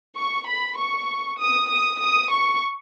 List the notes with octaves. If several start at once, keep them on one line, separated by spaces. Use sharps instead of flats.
C#6
B5
C#6
D#6
D#6
D#6
C#6